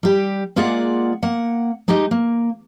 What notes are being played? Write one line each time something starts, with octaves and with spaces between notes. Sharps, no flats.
G3 G4
G#3 A#3 F4 G#4 D5 F#5
A#3 F#5
G#3 D#4 G4 D#5
A#3